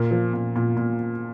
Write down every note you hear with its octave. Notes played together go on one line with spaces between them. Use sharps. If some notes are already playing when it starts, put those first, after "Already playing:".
Already playing: A#2 A#4
F3
A#2
A#2
A#2